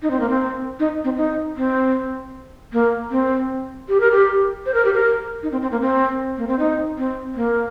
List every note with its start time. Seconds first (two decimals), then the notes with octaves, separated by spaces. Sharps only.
0.02 D#4
0.11 C4
0.20 A#3
0.29 C4
0.80 D#4
1.04 C4
1.17 D#4
1.56 C4
2.73 A#3
3.11 C4
3.89 G4
4.00 A#4
4.11 G4
4.66 C5
4.74 A#4
4.85 G4
4.93 A#4
5.43 D#4
5.52 C4
5.62 C4
5.72 A#3
5.81 C4
6.37 A#3
6.47 C4
6.59 D#4
6.98 C4
7.35 A#3